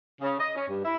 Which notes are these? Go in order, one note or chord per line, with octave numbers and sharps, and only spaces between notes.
C#3
D#5
C#4
G2
E4